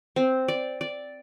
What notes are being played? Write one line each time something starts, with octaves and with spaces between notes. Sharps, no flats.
C4
D5
D5